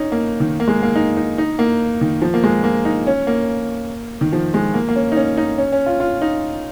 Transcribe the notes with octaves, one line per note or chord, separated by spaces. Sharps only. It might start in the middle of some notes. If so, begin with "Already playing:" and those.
Already playing: C#4 D#4
A#3
D#3
A#3
G#3
A#3
D#4
D#4
D#4
A#3
D#3
F3
A#3
G#3
A#3
D#4
C#4
A#3
D#3
F3
G#3
A#3
A#3
C#4
D#4
C#4
D#4
C#4
C#4
F4
F4
D#4